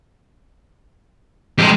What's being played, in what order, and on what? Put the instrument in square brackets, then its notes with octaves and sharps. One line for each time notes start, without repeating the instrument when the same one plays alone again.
[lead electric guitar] F2 C3 [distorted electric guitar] G#3 G4